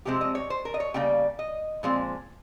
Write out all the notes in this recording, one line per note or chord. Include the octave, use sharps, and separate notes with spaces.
C3 F3 G#3 C4 G4
D#5
C#5
C5
A#4
D#5
C#5
C#3 G3 A#3 G5
D#5
A#2 F3 G#3 C4